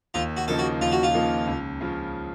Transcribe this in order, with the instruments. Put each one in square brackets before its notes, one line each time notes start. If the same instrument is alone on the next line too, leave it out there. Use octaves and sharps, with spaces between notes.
[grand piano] D#2 [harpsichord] F4
[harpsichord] F#4
[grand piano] C#3 F3 A#3 D#4 [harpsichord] A4
[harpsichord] F#4
[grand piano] D#2 [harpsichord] F4
[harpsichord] F#4
F4
[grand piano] C#3 F3 A#3 D#4
C#2
C#3 F3